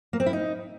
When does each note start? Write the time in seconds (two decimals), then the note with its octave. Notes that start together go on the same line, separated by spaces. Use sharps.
0.13 A#3
0.20 C4
0.26 E4
0.33 D#4